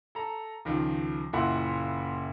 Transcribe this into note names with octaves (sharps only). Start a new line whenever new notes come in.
A4 A#5
C#2 D#3 F3
F#1 A#2 E4 F5 F#5 C6